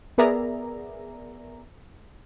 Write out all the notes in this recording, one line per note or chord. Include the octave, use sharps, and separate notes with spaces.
B3 G#4 A#4 D5 E5 A#5